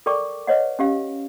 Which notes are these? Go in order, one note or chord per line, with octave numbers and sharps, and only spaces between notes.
A4 A#4 D5 G5 C#6 D6
B4 C#5 D#5 F#5
C#4 G4 F5